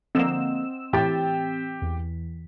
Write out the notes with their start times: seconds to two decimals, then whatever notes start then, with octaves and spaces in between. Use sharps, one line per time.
0.15 D3 F3 A#3 C4 D#5 F#5 E6 E7
0.93 A2 E3 G4 G5 A6
1.82 E2 E3